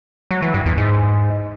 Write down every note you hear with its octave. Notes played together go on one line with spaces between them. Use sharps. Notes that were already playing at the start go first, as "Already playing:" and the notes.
F#3
E3
G2
E2
G#2